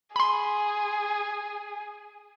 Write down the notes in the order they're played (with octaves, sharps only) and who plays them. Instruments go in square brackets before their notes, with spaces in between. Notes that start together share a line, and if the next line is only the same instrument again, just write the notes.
[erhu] G#4 [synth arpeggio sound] B5 C6